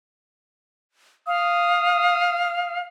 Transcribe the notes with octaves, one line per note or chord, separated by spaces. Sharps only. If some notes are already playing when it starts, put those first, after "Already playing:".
F5 D#6